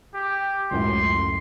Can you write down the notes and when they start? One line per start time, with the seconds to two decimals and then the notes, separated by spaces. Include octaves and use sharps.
0.14 G4
0.71 C#2 F#2 A2 C6